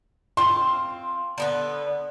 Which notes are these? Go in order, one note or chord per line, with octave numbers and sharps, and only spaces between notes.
C4 F4 C6
D3 B3 B4